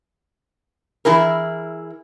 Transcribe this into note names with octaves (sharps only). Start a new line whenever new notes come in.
E3 E4 G#4 A#4